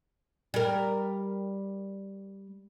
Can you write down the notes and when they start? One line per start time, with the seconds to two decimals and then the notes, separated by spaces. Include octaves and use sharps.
0.54 G3 A#4